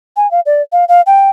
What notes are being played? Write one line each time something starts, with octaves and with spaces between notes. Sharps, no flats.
G#5
F5
D5
F5
F5
G5